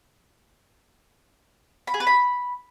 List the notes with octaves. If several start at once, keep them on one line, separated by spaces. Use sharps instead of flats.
B5
G#4
B4
B5